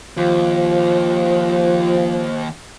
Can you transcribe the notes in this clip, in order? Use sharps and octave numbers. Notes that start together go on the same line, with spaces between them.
D#2 F3 F4 C5